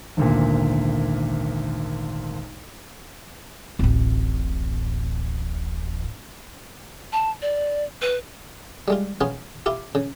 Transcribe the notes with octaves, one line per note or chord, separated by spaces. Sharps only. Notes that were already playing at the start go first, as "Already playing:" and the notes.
G#1 D2 A#2
D1 A1
A5
D5
B4
G3 G#3 F4
B3 C#4 F4 G#4
E4 F4 G4
C#3